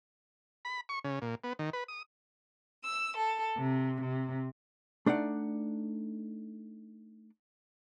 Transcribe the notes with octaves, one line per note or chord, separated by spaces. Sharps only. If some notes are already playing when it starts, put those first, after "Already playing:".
B5
C#6
C#3
A#2
B3
D#3
B4
D#6
E6
A4
C3
C3
A3 D4 D#4 D5 F#5